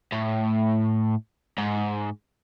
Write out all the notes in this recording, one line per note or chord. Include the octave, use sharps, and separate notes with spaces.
A2
G#2